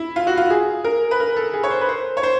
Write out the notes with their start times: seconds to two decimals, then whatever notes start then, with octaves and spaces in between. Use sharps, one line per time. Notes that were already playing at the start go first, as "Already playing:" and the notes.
Already playing: E4
0.16 F4
0.27 F#4
0.37 F4
0.50 G#4
0.84 A#4
1.11 B4
1.20 A#4
1.36 A4
1.54 G#4
1.63 C#5
1.71 C5
1.81 B4
1.89 C5
2.17 C#5
2.23 C5